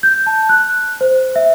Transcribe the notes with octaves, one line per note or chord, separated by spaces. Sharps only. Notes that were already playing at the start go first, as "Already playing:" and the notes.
G6
A5
F#6
C5
E5